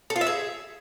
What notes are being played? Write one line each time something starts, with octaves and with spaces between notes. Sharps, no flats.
A4
F4
E5
G#4